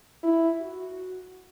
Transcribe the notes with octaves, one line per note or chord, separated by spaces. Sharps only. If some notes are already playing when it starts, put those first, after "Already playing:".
E4
F#4